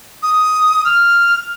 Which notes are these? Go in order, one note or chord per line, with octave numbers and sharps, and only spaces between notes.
D#6
F6